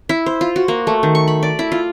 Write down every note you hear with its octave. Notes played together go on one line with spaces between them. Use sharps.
E4
C5
F4
F#4
A#3
A3
D#3
C#6
B5
D5
E4
F4